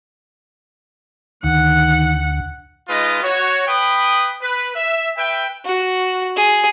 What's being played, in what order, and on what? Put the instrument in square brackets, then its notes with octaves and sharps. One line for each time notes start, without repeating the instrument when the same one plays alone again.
[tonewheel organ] D2 [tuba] D#3 [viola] F#5
[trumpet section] G#3 D#4 F4 B4 D#5
F#4 C#5
B4 G5 B5 D#6
B4
E5
B4 E5 G5
[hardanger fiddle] F#4
G#4